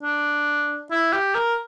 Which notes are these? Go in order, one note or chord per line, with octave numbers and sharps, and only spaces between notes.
D4
E4
G4
A#4